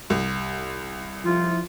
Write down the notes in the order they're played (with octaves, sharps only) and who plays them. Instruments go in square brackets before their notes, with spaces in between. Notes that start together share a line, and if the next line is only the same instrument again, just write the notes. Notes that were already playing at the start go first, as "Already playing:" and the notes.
[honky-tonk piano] C2
[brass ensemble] F3 E4 [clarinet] F4